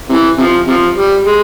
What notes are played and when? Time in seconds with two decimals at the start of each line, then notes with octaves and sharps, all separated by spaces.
0.09 C3 E3
0.38 C3 F3
0.67 C3 F3
0.96 G3
1.24 G#3